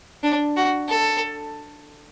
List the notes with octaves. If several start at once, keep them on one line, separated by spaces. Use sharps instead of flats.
D4
F#4
A4